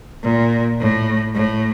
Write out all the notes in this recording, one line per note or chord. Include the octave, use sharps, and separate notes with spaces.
A#2
A2
A2